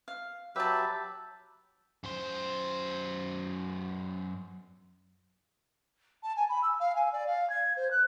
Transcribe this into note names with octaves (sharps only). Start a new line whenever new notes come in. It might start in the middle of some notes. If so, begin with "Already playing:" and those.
F5
F#3 G4 B4 E5 A5
F#2 C5
A5
G#5
B5
E6
F5
G#5
D5
F5
G#6
C5
F#6